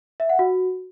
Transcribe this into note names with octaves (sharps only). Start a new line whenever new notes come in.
E5
F#5
F#4